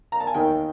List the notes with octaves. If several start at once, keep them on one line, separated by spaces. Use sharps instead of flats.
A#5
A5
G#5
D#2 D#3 G5